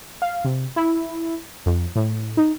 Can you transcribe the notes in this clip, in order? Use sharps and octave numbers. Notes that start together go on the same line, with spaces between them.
F5
C3
E4
F2
A2
D#4